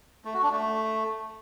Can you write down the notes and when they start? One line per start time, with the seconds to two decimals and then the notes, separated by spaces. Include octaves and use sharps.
0.25 A3
0.34 F#4
0.43 D4
0.52 A3